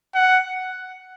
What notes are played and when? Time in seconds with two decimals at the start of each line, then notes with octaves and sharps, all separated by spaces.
0.15 F#5